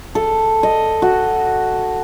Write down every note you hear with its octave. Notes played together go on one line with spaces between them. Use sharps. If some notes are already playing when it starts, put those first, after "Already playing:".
A4
D#5
F#4